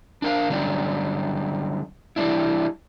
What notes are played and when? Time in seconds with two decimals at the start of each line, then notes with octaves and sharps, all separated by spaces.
0.22 D4 A#4 F5
0.50 D3 F#3 G3 C#4 D4
2.16 E3 G3 A#3 C#4 D4 E4